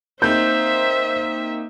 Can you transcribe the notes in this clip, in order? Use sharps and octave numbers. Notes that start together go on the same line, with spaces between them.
A#3 C4 D#4 C5 E5 G6